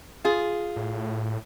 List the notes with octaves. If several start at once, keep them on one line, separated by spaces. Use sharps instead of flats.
F4 G#4
A2